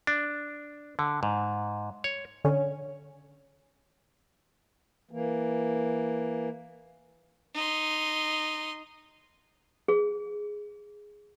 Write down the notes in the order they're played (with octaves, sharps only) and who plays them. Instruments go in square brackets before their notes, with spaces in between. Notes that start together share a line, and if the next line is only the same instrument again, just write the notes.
[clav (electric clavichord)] D4
D3
G#2
C#5
[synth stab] D3 C#4
[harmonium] E3 A#3
[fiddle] D#4 C6
[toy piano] G#4